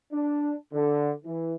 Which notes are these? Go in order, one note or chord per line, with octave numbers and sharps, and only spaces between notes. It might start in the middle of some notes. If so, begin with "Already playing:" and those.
D4
D3
E3